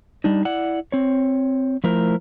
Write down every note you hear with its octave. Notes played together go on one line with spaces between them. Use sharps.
G3 D4 D#4
E4 D5 F#5
C4 C#5
F3 A3 E4 A#4 C5